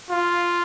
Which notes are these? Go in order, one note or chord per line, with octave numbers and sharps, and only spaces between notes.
F4